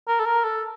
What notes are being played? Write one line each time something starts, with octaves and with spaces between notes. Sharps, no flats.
A#4
A4
A#4
A4